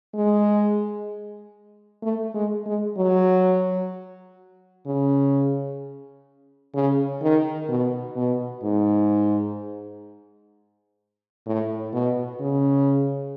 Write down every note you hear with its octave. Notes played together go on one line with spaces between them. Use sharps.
G#3
A3
G#3
G#3
F#3
C#3
C#3
D#3
B2
B2
G#2
A2
B2
C#3